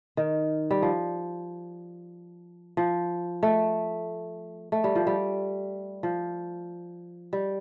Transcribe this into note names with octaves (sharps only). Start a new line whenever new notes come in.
D#3
G3
F3
F3
A3
A3
G3
F3
G3
F3
G3